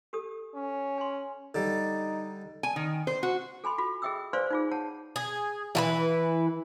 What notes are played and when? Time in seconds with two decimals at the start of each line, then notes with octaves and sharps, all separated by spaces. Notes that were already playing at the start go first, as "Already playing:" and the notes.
0.13 G4 A4 D#6
0.55 C#4
0.98 G#5 C6
1.55 D3 G3 D#4
2.63 G#5
2.76 D#3
3.07 C5
3.23 F#4
3.64 A4 G#5 B5 C6
3.78 F4 F#4 A4 B5
4.02 G#4 D#5 E5 G5 D#6 E6
4.33 B4 C5 D5 F5 G#5 C6
4.51 D#4 F4 G#4
4.72 C#5 F#5 A5
5.16 G#4
5.75 E3 E4 F4 B4